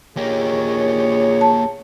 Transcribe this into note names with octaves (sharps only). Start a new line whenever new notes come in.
A#1 A#3 G4 G#4 C#5
A5